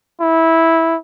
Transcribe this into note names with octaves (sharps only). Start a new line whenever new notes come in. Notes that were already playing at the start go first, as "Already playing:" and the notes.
E4